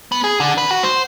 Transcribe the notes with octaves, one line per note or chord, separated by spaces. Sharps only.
B3
G#4
D3
B4
F#4
C5